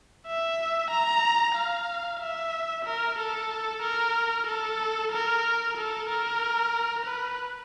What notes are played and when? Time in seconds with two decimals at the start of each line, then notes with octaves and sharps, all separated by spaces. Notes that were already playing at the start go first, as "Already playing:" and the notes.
0.27 E5
0.91 A#5
1.55 F5
2.20 E5
2.85 A#4
3.18 A4
3.83 A#4
4.47 A4
5.12 A#4
5.77 A4
6.09 A#4
7.06 B4